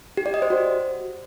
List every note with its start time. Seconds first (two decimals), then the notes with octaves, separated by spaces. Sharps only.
0.17 G4
0.26 D5
0.34 D#5
0.42 C5
0.50 F#4